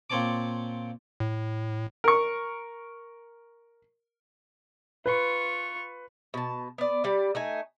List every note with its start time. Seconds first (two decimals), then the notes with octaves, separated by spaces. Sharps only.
0.10 A#2 C4 C#5 D5 A5 D6
1.20 A2
2.04 A#4 C#6
5.06 F4 B4 C#6
6.34 B2 A5
6.78 B3 D5
7.04 G3 D5
7.35 A3 D#4 G#5